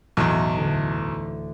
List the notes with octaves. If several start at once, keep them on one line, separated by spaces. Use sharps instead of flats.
B1 E2 A2 E3
D2 D7